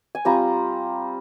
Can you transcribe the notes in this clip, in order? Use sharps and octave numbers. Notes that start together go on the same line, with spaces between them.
G#5
G3 C4 F4 A#5